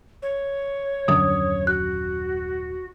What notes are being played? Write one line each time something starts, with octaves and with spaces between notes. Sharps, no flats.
C#5
D#1 F#2 D3 D#6
F#4 F#6